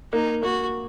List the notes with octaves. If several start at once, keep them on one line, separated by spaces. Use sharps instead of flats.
A#3 D#4
A#3 F#4